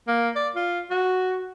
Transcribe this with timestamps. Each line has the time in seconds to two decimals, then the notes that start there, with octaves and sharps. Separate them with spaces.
0.08 A#3
0.36 D5
0.56 F4
0.91 F#4